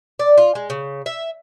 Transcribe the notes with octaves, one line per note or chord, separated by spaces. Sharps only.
D5
F4
G#3
C#3
E5